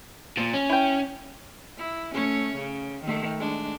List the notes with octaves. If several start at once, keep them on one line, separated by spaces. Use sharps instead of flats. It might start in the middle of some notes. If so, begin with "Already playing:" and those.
A#2 F3
C#4
E4 G5
E4
A3 C#4 C#5
C#3
D#3 A3
G#3 D4